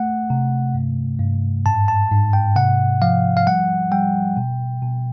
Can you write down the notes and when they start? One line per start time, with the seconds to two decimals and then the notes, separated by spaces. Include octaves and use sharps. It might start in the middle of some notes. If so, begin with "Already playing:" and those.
Already playing: A3 F#5
0.30 C3
0.74 G2
1.20 G2
1.66 G#2 A5
1.88 A5
2.11 G#2
2.33 G5
2.56 C3 F#5
3.02 F3 F5
3.37 F5
3.47 G3 F#5
3.91 G3 G5
4.37 B2
4.83 B2